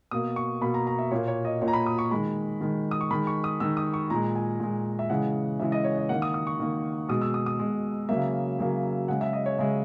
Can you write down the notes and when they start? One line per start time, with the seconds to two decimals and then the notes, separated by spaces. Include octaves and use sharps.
0.11 B2 A#3 D#6
0.36 C#6
0.61 B2 A#3 B5
0.74 A#5
0.87 A#5
0.99 E5
1.11 A#2 A#3 C#5
1.28 C#5
1.45 D#5
1.61 A#2 A#3 C#5
1.68 A#5
1.73 B5
1.86 D#6
1.98 C#6
2.11 D#3 G#3 B5
2.61 D#3 G#3
2.91 D#6
3.01 C#6
3.11 D#3 G#3 B5
3.27 C#6
3.44 D#6
3.60 D#3 G#3 E6
3.77 D#6
3.94 C#6
4.10 A#2 G#3 A#5
4.35 G#5
4.60 A#2 G#3
4.99 E5
5.10 C#3 E3 G#3 F#5
5.59 C#3 E3 G#3 E5
5.72 D#5
5.84 C#5
5.97 D#5
6.09 D#3 A#3 F#5
6.22 D#6
6.34 D#6
6.47 C#6
6.59 D#3 A#3
7.09 B2 G#3 D#6
7.22 E6
7.34 D#6
7.46 D#6
7.59 B2 G#3
8.09 C#3 F#3 A#3 E5
8.59 C#3 F#3 A#3
9.08 C#3 G#3 F#5
9.21 E5
9.33 D#5
9.46 C#5
9.59 C#3 G#3 E5